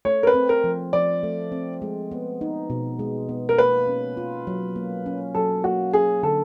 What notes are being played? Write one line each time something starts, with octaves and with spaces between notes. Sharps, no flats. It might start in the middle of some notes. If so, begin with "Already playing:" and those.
A3 C#5
A#4
B4
C4
A#4
F3
F3 D5
A3
C4
G#3
B3
D#4
B2
G#3
B3
A#4
A#3 B4
C#4
F4
F#3
A#3
C#4
F#3 A4
A#3 F#4
C#4 G#4
D3 A4